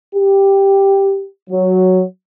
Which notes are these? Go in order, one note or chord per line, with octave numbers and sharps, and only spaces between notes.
G4
F#3